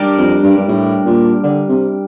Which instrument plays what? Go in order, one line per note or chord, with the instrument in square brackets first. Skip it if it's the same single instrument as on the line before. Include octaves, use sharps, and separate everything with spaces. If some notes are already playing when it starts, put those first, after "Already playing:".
Already playing: [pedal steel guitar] G3 D4 G4 A#4 D5
[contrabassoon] F2
G2
G2
A2
A#2
D3
C3